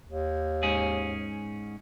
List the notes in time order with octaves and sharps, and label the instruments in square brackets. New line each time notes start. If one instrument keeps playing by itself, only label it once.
[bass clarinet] D#2
[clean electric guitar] G#2 C#4 G#4